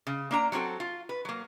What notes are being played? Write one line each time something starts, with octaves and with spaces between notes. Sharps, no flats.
C#3
A#3 D4 A#5
F#3 G3 C4 F#4 A4
F4
B4
F#3 A#3